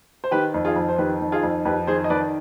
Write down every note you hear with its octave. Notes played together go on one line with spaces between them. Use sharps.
C5
D#3 G4 B4
F2
F4 G#4
F2
C5
D#3 G4 B4
D#3
F4 G#4
F2
F2 G4 B4
D#3 G#4 C5
D#5
D#3 B4 D5